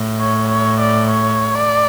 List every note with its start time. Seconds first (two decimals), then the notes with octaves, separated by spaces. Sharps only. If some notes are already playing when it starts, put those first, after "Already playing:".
Already playing: A2
0.19 C#5
0.49 C#5
0.79 D5
1.11 C#5
1.55 D5